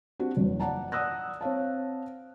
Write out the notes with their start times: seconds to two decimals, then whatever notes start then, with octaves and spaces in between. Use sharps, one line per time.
0.19 C4 D4 F#4 G4
0.37 F#1 E2
0.60 D5 F#5 A5 A#5
0.92 D5 F#5 D#6 E6 F#6 A#6
1.41 C4 C#5 F5 A5